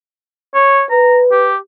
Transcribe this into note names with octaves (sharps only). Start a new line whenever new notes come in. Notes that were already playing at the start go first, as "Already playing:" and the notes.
C#5
B4 A#5
G4